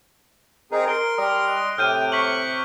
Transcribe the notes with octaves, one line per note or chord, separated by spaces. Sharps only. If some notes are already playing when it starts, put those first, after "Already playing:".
C4 D#4 G#4 A#4
A#4 C6 D7
G3 A#4 D#6
D#5 F#6
A2 C3 G5 F6 G6 D#7
C#6 B6 F#7